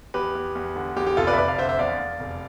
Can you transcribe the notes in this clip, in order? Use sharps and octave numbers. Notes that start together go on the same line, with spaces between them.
E2 G4 B4
E2
E2
D3
E2 G4
G4
F1 F4 A4
B4 D5
E5
F1 B4 D5
D5 F5
D3 C5 E5
C5 E5
E2 D5 F5
E2
F1